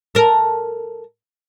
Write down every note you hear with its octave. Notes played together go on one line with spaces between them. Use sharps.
A4 A#4